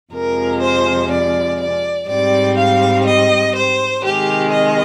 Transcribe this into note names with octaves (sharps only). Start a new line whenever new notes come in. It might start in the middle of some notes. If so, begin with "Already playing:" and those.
F2 C3 F3 G#3 A#4
C5
D5
D5
G#2 G3 C4 D5
F5
D#5
C5
C3 D#3 G#3 G4
D#5